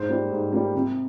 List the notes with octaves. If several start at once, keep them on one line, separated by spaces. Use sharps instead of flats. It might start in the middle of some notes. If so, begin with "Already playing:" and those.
Already playing: G#2 C5
G3 A#3
G#2
G3 A#3
C3